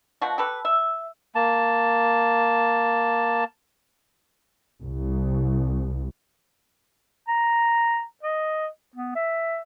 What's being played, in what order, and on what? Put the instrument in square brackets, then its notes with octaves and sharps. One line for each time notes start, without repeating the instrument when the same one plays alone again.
[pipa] B2 F3 F#4
G4 A4 B4
E5
[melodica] A#3 A5
[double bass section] C2
[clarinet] A#5
D#5
B3
E5